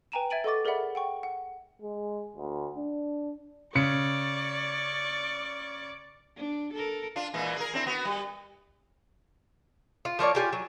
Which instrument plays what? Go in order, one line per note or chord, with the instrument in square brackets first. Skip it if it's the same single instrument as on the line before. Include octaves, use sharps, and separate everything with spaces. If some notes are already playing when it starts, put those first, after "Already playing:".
[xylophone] B4 G5 G#5 A#5 D#7 E7
E5 G#6 A6 D7 D#7 F#7
A4 D#5 F#5 C#6 D6 A6
G#4 A#4 D5 E5 F#5 B5
F#5 G5 C#6
F#5
[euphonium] G#3
D2
D4
[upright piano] C#3 C#7 [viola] D5 C#6
[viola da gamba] D4
A4 A#4
[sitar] D4 F4
A#2 E3 G#3
G#4 A#4
C4 D4 E4
B3 F#4
G3
[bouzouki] F4
F3 A#3 C#5 D5
F4 G4 G#5
F#3